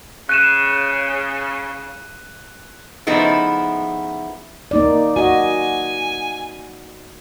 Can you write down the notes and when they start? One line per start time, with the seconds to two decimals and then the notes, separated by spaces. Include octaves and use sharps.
0.29 C#3 F#6 D#7 E7
3.07 C#3 F3 A3 B3 D#4 E4
4.71 A#3 D#4 D5
5.16 F#4 D#5 G#5